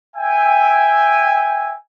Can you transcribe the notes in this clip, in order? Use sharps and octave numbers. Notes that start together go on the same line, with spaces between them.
E5 G5 G#5